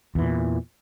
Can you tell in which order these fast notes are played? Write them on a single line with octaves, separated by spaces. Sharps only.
E2 E3 A#2